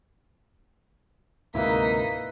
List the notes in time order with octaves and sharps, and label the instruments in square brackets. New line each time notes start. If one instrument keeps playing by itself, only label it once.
[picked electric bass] D2 G#2 C3 [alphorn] A#3 [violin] D#4 B6 [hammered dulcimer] E4 B4